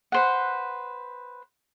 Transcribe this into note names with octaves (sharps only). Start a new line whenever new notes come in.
B4 C5 F#5